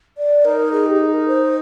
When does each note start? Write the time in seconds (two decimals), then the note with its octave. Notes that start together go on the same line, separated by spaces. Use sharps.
0.18 D5
0.45 D#4 A#4
0.72 G#4
0.86 G4
1.00 G#4
1.14 A#4
1.28 C5